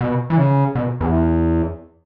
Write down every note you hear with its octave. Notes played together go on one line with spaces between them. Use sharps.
B2
E3
C#3
B2
E2